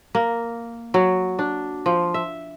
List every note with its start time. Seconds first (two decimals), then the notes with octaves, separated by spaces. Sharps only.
0.15 A#3
0.94 F#3
1.39 D4
1.86 F3
2.14 E5